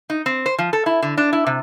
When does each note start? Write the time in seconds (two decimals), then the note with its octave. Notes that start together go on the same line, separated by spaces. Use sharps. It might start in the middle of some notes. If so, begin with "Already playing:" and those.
0.10 D#4
0.26 C4
0.46 C5
0.58 F3
0.73 A4
0.86 E4
1.02 D3
1.18 D4
1.33 E4
1.47 C3